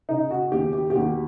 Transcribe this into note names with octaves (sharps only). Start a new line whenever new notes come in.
C#3 D#4
F#4
D#2 G4
G4
G4
D#2 F#4